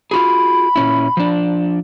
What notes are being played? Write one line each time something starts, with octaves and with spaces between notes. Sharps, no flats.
F4 F#4 G#4 B5
A#2 C#4 E4
F3 D4